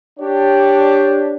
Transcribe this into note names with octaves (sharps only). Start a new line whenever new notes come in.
D4 G4 C#5